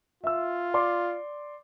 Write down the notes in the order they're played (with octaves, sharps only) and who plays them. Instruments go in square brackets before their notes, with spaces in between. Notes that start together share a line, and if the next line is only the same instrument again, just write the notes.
[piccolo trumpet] F4 [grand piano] E5 E6
[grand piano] D5 C6 D6